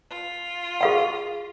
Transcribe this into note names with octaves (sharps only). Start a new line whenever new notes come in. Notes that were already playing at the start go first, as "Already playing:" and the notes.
F4
G#4 F5 F#5